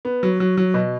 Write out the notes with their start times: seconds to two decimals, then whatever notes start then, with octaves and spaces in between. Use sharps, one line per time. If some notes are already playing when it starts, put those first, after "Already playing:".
0.05 B3
0.23 F#3
0.40 F#3
0.57 F#3
0.74 B2